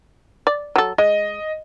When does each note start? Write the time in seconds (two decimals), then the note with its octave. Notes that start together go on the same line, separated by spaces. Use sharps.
0.47 D5
0.76 F#3 A4
0.98 G#3 D#5